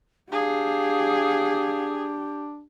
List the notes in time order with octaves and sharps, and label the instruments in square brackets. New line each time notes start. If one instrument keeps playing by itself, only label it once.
[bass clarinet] D4 [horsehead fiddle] G4 [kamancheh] G#4 [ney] F5